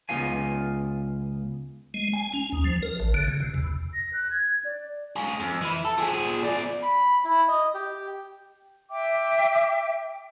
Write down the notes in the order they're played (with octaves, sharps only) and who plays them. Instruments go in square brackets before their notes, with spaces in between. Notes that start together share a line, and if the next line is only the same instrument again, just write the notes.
[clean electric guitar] C#2 B3 F4 F5 G#5
[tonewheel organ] G#3
G#5
C#4
D#2
F3
A#4
A1
D3
C#3
C3
E2
[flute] A#6
F#6
G#6
D5
[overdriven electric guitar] F4 G#4
F2
E3 E4
A4
F3 G#4
B3 D5
[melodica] B5
E4
D#5
G4
[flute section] E5 G5 D6